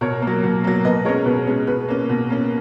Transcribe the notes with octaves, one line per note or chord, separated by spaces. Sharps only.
B2 A#4 C#5
A#3
F#3
B2
F#3 A#3
B2 B4 D#5
G#3 C#4 A#4 C#5
B2 B4
G#3 C#4
B2 B4
A#3 C#4
B2
A#3 C#4